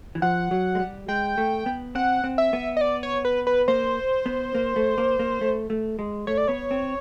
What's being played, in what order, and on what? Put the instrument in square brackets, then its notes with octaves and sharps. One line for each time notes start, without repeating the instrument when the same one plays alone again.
[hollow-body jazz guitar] E3
[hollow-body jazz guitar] F3 [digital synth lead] F#5
[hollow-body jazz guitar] F#3
G#3
G3
[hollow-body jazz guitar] G#3 [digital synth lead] G5
[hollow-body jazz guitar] A3
B3
[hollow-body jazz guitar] C4 [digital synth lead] F#5
[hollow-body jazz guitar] C4
[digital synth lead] E5
[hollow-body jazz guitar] B3
[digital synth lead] D#5
D5
C#5
B4
B4
[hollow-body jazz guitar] A#3 [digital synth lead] C5
[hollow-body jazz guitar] B3
A#3
A3
A#3
A#3
A3
A3
G#3
[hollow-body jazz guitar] A3 [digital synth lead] C#5
[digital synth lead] D5
[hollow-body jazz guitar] B3 [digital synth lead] C#5
[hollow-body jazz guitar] C4